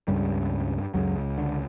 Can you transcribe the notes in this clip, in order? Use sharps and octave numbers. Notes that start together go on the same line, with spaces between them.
C#2 G2 C#3 G3
C#2 F#2 C#3 F#3
D3